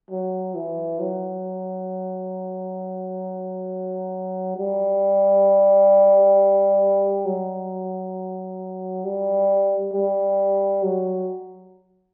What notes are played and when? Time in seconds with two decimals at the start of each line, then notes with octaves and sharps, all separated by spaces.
0.11 F#3
0.55 E3
0.99 F#3
4.57 G3
7.25 F#3
9.05 G3
9.94 G3
10.84 F#3